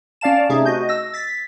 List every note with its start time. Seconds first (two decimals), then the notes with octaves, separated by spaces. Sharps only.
0.21 C#4 D5 F5 A5 E7
0.49 C3 A3 C#4 D#4 G#4
0.65 F#4 D#5 G6
0.89 E6 A#6
1.14 A6 B6